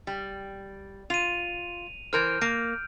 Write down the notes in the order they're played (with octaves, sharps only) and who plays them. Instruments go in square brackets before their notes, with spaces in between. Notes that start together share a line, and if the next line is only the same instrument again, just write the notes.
[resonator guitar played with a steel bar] G3
[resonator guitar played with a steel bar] F4 [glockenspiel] D#7 F7
[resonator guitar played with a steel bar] E3 A#4 C5 [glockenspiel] F6 G6
[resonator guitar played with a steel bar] A#3 [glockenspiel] D7